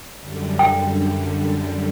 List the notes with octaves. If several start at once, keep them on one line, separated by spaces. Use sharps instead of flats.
F#2 D3 G3
G5